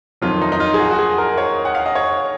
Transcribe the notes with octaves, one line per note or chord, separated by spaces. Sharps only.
F2 D#3 F#3 F4
D#4
D#4
F4
G#4
F#4
F#4
G#4
A#4
C#5
F#5
F5
D#5
C#5